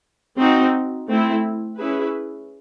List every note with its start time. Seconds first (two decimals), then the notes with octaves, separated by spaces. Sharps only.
0.37 C4 D#4 F#4
1.07 A3 C4 E4
1.78 C#4 E4 G#4 B4